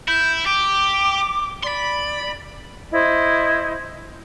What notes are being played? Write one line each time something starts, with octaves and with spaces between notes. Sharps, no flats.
E4 G6
G4 D6
D5 B5 C6
E4 C5 D#5